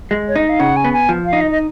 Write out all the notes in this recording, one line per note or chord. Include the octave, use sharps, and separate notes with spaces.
G#3
C#5
D#4 D#5
F5
C#3 F#5
G#5
B3
G#5
F3
F5
D#4
D#5
D#5